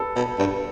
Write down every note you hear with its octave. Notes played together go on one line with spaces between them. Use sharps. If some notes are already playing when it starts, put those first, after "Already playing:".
Already playing: A4 B4
B2
G2